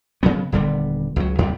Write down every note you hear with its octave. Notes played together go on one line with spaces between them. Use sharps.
C#3 F#3 B3
D#1 D3 G3 B3
C#2 F#3
D#2 C3 G3